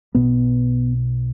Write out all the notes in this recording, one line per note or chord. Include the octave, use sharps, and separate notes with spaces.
B1 B2 B3